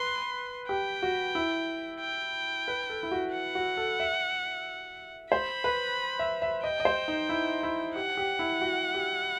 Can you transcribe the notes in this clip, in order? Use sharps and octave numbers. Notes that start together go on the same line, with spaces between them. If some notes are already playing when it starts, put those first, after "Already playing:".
Already playing: B4 C6
G4 G5
F#4
E4
G5
B4
A4
E4
F#4
F#5
F#4
A4
E5
C5 B5
B4
E5
E5
D#5 G5
D#5
C5
D#4
E4
E4
G4 F#5
G4
E4
F#4
G4